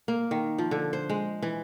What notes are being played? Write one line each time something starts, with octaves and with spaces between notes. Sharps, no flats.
A#3
D#3
F3
D3
C5
G#3
E3